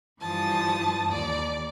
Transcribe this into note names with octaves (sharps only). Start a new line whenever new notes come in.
G2 E3 F3 A5 D#6
D#2 D5